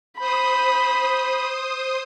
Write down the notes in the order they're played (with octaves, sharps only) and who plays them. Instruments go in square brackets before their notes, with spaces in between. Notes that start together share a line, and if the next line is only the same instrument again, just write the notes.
[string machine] C5 D#6 [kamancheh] B5